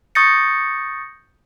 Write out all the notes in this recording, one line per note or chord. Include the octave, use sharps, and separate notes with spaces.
C#6 D#6 G6 A6 A#6 C#7